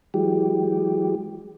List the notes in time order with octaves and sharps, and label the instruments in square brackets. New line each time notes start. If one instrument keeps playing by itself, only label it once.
[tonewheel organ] E3 F#3 G#3 G4